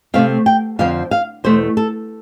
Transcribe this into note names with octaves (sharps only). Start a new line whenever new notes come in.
C3 E3 A3 C4 F5
G5
F2 D3 F3 C4 F5
F5
E2 B2 A3 C5
A4